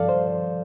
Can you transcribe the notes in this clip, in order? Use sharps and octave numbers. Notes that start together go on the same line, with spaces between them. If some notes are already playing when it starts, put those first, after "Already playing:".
Already playing: G2 F3 A4 D5 F5
C5